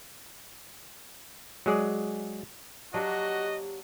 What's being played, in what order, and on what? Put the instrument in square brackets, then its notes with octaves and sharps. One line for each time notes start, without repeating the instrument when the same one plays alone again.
[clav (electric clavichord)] F#3 G#3 G#4 D5
[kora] F#3 A#3 D4 [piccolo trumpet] F#4 [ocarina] G4 [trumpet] D#5